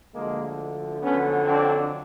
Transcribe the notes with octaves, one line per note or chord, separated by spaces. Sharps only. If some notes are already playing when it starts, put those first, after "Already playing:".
D2 D3 F3 G#3 A#3
F2 D3 F#3 B3 C#4
C4 D4